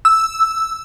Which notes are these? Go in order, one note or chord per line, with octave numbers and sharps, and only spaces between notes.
E6